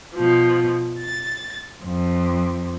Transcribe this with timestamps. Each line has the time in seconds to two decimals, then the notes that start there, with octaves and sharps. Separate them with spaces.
0.15 B2 F3
0.96 A6
1.82 F2